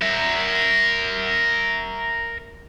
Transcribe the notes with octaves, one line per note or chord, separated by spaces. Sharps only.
A#4 E5